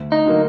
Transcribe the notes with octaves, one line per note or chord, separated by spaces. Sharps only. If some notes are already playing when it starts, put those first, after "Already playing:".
Already playing: D2
D#4
D3 F#3 A#3